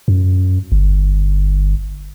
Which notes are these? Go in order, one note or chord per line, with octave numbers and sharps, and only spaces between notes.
F#2
G1